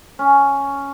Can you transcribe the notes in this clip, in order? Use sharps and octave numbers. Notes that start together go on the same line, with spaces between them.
C#4